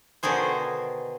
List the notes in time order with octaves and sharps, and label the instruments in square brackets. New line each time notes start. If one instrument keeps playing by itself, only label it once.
[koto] B2 D3 D#3 G#4 C5